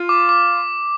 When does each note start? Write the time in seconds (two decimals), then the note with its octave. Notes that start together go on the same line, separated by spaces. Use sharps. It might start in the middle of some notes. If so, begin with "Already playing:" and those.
Already playing: F4
0.09 D6
0.29 D6